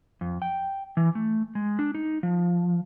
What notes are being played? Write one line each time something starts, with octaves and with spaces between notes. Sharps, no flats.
F2
G5
E3
A3
G#3
D4
D#4
F3